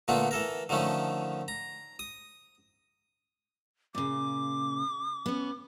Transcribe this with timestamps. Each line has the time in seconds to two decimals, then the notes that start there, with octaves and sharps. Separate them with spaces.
0.08 A#2 D3 A3 B3 F4
0.31 E3 A4 A#4
0.69 D3 D#3 F3 A3 C#4
1.48 A#5
1.99 D#6
3.95 A#2 C#3 D6
5.26 B3 C#4